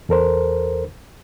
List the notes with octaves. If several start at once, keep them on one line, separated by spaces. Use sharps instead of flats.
E2 A4 A#4 C5